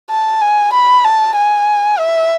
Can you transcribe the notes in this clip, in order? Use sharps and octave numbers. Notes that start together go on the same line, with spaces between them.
A5
G#5
B5
A5
G#5
E5